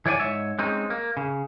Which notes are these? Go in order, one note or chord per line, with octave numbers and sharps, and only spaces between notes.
E3 C#5 D5 F#5 G#5
G#2 C#5 E5
G#3 C4 C#4 D#4
A#3
C#3